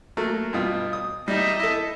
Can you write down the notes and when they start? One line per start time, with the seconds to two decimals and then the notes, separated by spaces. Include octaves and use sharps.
0.17 F#3 A3 A#3
0.53 G2 B2 F4
0.93 D#6
1.28 G3 D#4 D#5 E5
1.60 E4 A4